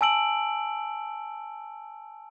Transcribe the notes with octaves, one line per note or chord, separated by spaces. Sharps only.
G#5 A5 E6 D7 F#7